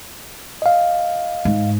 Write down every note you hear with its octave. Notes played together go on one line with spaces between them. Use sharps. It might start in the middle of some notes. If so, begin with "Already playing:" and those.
D#5 F5
G#2